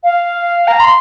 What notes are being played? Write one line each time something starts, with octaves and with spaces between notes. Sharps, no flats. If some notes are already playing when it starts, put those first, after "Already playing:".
F5
A#5
C6